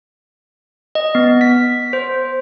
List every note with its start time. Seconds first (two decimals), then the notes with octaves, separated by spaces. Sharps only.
0.95 D#5
1.15 B3
1.41 B6
1.93 C5